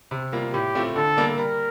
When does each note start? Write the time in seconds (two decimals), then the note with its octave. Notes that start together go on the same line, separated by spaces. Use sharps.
0.11 C3
0.32 G3 A#3 F4
0.54 A2 G4
0.75 A3 C4 F4
0.96 D3 A4
1.17 G3 A#3 D4
1.38 G3 A#4